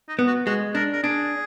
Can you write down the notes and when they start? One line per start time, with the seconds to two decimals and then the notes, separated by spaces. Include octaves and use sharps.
0.08 D#4
0.19 B3
0.27 F#4
0.46 G#3 F#4
0.75 D4 A#4
0.93 A#4
1.03 D4 G#4